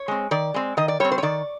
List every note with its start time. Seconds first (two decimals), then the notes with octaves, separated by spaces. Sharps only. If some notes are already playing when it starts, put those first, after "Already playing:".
Already playing: C#5
0.08 G#3 C4
0.31 D#3 D5
0.54 G#3 C4
0.77 D#3 D#5
0.88 D5
1.00 G3 C4 C#5
1.12 C5
1.18 C#5
1.22 D#3 D5